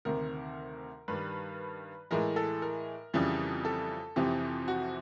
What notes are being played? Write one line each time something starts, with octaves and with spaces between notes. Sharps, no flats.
D2 C3 D#3 A#4
G2 D#3 G3 B4
A2 E3 G#3 A#4
A4
A#4
F2 C#3 E3 G3
A4
F2 C3 E3 G4
F#4